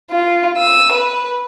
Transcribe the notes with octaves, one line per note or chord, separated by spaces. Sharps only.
F4
E6 D#7
B4